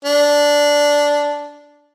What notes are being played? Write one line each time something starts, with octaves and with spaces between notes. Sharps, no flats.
D4